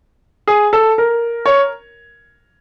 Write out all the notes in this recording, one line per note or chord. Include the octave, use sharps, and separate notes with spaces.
G#4
A4
A#4
C#5